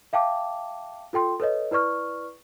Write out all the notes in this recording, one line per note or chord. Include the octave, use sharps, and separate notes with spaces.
E5 F5 G5 A5 D6
F4 A4 G5 C6
A4 B4 C#5 D#5
E4 B4 D5 C#6 F6